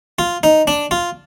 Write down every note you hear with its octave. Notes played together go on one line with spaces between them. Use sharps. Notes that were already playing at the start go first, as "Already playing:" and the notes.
F4
D#4
D4
F4